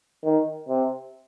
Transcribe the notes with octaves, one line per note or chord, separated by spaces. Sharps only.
D#3
C3